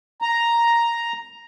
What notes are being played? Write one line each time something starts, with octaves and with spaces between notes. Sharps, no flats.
A#5